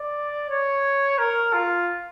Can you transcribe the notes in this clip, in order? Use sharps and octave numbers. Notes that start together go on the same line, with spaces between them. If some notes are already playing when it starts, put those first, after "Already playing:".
Already playing: D5
C#5
A#4
F4